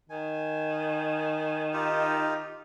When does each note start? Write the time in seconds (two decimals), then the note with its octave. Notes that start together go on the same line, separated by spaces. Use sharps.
0.10 D#3 G#5
1.73 D#4 F4 G4